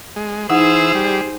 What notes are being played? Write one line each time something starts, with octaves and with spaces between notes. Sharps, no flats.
G#3
E3 D#4 G#4 C5 F#5 E6
G3